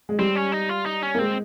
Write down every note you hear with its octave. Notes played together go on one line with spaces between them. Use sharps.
G#3
G3 C4
C#4
D#4
F4
D#4
C#4
A#3
G#3 C4